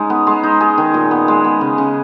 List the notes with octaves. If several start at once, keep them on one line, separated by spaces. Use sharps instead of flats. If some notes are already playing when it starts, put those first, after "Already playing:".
Already playing: G#3 C#4 D#4
B3
G#3
D#4
G#4
D#3
A#2
B3
G#3
B3
C#3
C#3